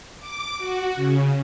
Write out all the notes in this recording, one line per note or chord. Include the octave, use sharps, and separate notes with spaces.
D6
F#4
C#3